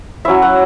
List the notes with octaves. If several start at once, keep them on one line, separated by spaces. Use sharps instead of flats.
F#3 C#4 E4 E5
F#5